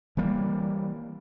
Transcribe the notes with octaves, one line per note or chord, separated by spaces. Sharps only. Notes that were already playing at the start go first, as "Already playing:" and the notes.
E3 G3 A#3